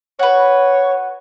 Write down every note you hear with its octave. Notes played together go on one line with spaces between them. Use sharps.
F#4 B4 C#5